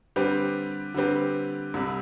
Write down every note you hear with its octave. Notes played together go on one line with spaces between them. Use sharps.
D3 G3 C4 G4 B4
D3 G3 C4 G4 B4
C2 C3 G3